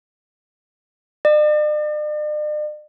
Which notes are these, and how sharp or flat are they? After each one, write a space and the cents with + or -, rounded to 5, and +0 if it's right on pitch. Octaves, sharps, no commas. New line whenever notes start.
D5 +45